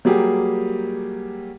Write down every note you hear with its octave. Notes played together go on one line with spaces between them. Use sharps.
F#3 G3 A#3 G4 G#4